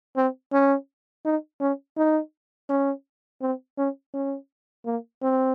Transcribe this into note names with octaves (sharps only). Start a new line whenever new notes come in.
C4
C#4
D#4
C#4
D#4
C#4
C4
C#4
C#4
A#3
C4